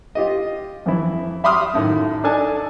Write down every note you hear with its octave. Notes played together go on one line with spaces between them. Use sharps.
F4 G4 D#5
F2 E3 E4
E5 B5 C6 D6 D#6 F6
F#2 A2 D#3
D4 D#4 A4 G#5 A5